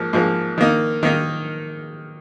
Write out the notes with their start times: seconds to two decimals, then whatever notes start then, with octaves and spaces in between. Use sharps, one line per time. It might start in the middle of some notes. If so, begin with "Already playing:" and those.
Already playing: G#2 F3 A#3
0.13 G#2 F3 A#3
0.58 D#3 A#3 D#4
1.03 D#3 A#3 D#4